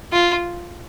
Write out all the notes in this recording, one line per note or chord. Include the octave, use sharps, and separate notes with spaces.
F4